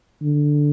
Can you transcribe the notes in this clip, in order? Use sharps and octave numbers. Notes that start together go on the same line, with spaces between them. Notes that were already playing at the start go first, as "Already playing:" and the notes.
D3